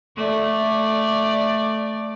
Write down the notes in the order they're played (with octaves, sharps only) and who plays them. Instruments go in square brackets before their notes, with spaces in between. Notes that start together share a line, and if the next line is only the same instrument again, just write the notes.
[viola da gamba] A3 D5